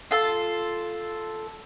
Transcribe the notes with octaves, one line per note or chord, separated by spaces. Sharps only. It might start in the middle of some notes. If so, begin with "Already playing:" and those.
F4 A4